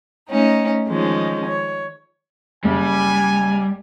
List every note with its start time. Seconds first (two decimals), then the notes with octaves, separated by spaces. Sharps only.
0.30 A3 C#4 D#4
0.89 D#3 F3 G#3 C#4
1.46 C#5
2.64 F#1 G3 G#5